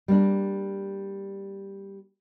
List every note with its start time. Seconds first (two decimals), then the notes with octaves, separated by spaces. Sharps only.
0.08 G3 A#3 D4